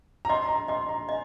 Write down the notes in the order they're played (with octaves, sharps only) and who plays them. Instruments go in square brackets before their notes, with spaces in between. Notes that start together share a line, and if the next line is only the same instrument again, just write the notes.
[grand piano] A#5
[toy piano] D#5 [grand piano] C6
[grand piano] A#5
[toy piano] D#5 [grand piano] C6
[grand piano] A#5
[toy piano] D#5 [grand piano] G#5